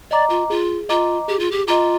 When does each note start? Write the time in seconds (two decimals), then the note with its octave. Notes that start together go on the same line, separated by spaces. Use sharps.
0.11 D5 D#5 A#5 D6
0.30 F4
0.50 F4 G#4
0.89 F4 D#5 A#5 D6
1.28 G4 G#4
1.39 F4
1.51 G4
1.68 F4 D#5 A#5 D6